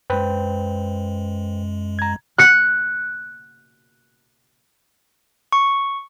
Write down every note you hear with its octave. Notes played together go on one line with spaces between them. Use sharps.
F#2 G#3 B4 C5 G5
A#5 G#6
F#6 C#7
C#6